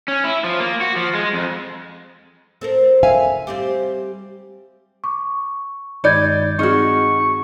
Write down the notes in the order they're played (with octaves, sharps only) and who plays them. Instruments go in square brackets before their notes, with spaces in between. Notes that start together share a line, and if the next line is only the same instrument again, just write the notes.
[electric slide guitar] C#4
E4
F3
A#3
F#4
F3
G#3
F2
[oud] C4 A4 A#4
[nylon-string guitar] E5 F5 G#5
[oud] G3 C4 G4
[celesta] C#6 [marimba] D6
[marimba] G2 D#3 G#3 [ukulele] D#4 D5 [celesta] B5 G6 G#6
[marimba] C4 G#4 F6 [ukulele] D#4 F#4 [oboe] C#6